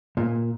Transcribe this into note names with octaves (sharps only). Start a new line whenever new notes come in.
A#2